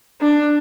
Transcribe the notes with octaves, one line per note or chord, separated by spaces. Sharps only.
D4